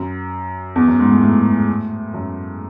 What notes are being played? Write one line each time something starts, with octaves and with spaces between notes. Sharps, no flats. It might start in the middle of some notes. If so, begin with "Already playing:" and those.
Already playing: F#2
E2
F#2
G#2
A2
A2
F#2